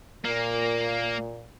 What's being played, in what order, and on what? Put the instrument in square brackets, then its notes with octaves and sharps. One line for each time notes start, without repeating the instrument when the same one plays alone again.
[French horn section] A#2 [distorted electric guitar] A#3